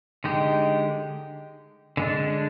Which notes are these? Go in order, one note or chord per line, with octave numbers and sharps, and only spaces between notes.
D3 G#3 D#4 G4
D3 G#3 D4